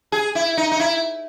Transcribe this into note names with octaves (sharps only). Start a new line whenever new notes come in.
G#4
E4
D#4
D#4
E4